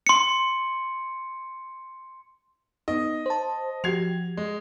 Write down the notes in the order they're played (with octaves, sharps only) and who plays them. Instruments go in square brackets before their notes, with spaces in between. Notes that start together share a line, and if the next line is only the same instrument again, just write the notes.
[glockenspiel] C6 C#7
[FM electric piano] B3 D#4 [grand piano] D#5
[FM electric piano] C5 A5
[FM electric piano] F3 F#4 G4 [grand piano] G#6 C7 F7
[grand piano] G#3